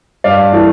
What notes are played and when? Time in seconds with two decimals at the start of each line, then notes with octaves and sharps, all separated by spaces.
0.24 G2 D5 F5
0.53 E3 A3